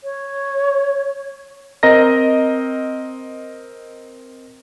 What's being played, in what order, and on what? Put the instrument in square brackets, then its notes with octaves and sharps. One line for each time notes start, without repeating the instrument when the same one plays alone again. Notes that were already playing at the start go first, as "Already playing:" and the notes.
[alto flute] C#5
[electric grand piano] C4 A#4 D#5 A#5 A#6